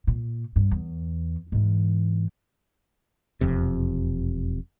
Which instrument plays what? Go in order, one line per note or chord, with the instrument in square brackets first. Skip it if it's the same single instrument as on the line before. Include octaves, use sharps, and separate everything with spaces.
[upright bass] A#2
G2
E2
G#2 E3
[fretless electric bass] E1 F2 C3